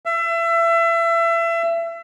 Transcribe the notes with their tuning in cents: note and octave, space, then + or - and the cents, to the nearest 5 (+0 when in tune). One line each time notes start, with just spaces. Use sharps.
E5 +30